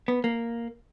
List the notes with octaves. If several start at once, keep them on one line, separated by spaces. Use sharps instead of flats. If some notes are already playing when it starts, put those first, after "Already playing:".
B3
A#3